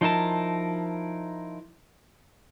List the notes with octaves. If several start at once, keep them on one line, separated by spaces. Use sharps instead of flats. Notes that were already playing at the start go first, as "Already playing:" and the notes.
F3 D#4 E4 A#4 A5